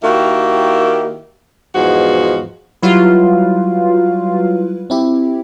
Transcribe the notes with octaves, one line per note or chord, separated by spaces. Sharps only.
D#3 A#3 E4 F#4 G4
E2 G#2 B2 F3 F#4
F#3 G3 E4 F4 B4
C4 E4 G4